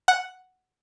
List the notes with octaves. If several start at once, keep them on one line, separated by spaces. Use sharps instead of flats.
F#5